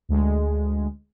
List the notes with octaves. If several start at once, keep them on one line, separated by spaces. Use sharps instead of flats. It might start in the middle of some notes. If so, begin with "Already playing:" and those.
D2 G#3